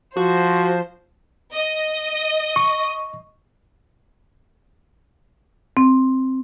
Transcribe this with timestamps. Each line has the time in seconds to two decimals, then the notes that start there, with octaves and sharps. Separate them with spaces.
0.17 F3 F#4 C5
1.53 D#5
2.56 C#6
5.77 C4